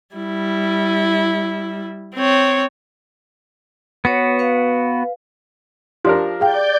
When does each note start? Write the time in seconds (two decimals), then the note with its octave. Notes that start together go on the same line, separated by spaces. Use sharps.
0.16 G3 E4
2.15 C4 C#5
4.05 B3 F#4 B4 C#5
4.39 B4 F5
6.05 F3 D4 G4 A#4 C6
6.40 G#4 D5 F5 G5 G6